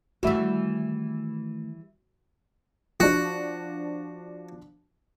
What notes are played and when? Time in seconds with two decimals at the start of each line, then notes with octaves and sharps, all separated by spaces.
0.23 D#3 E3 G3 A3 F#4 E5
3.00 F3 D4 F#4